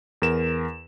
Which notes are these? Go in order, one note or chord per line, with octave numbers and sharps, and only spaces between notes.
E2 A#4 E7